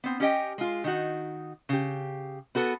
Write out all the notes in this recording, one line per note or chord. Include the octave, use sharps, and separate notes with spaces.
B3 C4
C#4 G4 D#5 G5
G#3 F4
D#3 D#4 F#4
C#3 G4
B3 F#4 A4 B4